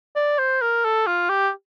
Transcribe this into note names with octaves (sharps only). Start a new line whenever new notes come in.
D5
C5
A#4
A4
F4
G4